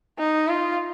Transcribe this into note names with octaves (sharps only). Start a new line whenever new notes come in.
D#4
F4